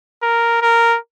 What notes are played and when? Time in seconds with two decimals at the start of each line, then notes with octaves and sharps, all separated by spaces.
0.23 A#4
0.62 A#4